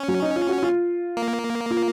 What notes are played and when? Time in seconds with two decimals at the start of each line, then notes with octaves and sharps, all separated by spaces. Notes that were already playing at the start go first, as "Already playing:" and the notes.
Already playing: C#4
0.08 F#3
0.22 D#4
0.36 F4
0.49 F#4
0.63 F4
1.17 A#3
1.71 F4